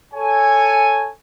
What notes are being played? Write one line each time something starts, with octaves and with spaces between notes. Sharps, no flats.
A4 C#5 G#5